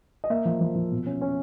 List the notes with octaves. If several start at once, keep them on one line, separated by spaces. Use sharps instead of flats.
D#5
A#3 E5
F3
F3
F3
B2
C#4
C#4